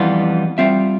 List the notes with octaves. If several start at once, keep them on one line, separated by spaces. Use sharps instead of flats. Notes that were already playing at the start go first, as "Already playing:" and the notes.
Already playing: F2 E3 G3 B3 F4
G3 C4 F4 C5 E5